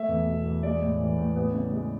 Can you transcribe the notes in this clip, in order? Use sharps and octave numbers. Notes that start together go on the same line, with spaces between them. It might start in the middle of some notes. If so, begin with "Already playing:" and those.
Already playing: A3 E5
E2
B2
E2
G#3 D5
A2
E3
A2
B3
C#3
G#3